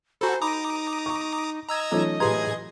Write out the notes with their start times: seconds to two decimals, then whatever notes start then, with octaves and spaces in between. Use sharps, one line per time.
0.21 F#4 A4 C5 G#5 A#5 B5
0.42 D#4 A#5 B5 D6 D#6
1.06 C#6
1.69 D#5 A#5 E6 G#6
1.92 E3 F#3 A3 C#4 D#4 F4
2.20 A2 G4 G#4 B4 A#5 C6 G#6